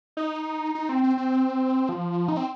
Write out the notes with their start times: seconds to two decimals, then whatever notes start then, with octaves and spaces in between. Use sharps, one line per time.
0.17 D#4
0.75 D#4
0.89 C4
1.03 C4
1.17 C4
1.89 F3
2.28 D#4
2.37 C4